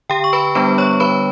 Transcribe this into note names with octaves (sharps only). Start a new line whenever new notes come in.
D3 G4 G5
C#6
B4 B5
G3 B3 D4 B4 B5
C#5 C#6
D3 B4 B5